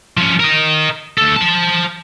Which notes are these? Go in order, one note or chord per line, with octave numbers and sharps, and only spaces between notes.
F3 C#4
A#4 D#5
D2 A4
C5 A5